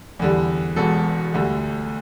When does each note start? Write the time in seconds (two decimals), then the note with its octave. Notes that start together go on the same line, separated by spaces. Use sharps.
0.19 E2 D3 G3
0.76 E1 E2 B2 A4
1.34 D2 D3 G3